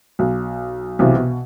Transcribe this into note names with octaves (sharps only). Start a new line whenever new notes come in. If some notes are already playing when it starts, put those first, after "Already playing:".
B1
B1 C3 E3
B2